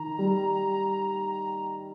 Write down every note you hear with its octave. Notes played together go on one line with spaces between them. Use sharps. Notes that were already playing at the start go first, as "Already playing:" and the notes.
Already playing: D#3 A#5
G3